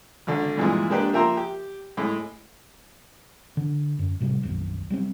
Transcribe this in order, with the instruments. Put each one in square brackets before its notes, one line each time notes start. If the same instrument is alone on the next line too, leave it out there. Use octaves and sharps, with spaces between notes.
[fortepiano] G#1 D3
G2 A#2 E3 F3 G#3
G#3 A#3 D4 G4 B4
F3 A#3 E5 G5 A#5 C6
G4
A2 G#3
[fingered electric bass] D3
F#2
A2 C3 D#3 G3
D#1 B1 F#2
F#3 G3 C4